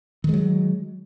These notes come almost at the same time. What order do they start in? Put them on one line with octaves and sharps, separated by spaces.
D#3 G#3 F#3